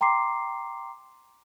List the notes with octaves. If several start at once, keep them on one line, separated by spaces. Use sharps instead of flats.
G5 A#5 C6 D6 C7